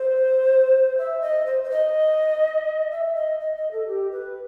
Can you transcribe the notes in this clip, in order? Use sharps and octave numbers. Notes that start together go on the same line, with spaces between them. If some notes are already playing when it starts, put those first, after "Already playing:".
Already playing: C5
E5
D#5
C5
C5
D#5
E5
D#5
D#5
D#5
A4
G4
B4